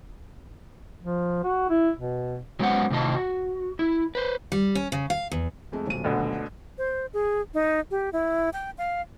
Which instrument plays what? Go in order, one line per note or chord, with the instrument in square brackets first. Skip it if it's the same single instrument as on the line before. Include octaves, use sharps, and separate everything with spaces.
[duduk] F3
F#4
E4
B2
[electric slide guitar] F#3 G#3 B3 C#4 C5 F#5
A2 C3 D#3 F4 D#5 A5
F#4
E4
B4 C5
[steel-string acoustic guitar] G3
C#4
C#3
F5
E2
[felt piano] F2 G#3 A3
D#1 B1 D#7
[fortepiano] D2 B2 D3
[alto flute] C5
G#4
D#4
G4
E4
G5
F5